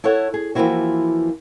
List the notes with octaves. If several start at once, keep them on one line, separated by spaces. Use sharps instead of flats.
E4 A4 C#5 F#5
G#4
E3 F3 A#3 C4 E4 F#4